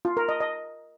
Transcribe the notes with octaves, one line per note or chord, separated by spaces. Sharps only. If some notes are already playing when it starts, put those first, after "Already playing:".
F4
A#4
D#5
D#5